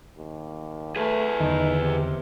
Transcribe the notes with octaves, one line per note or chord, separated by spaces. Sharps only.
D#2
A3 G#4 B4
E2 D3 D#3 D#4
C3